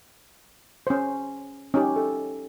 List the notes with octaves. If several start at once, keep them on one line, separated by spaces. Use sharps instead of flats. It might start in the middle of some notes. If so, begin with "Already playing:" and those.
C#4 C5
C#4 D#4 G4
A4